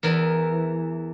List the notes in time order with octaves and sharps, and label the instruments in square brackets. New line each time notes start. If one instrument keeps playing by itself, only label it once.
[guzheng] E2 E3 A#4